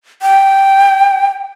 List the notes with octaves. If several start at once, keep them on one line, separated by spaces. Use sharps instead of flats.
G5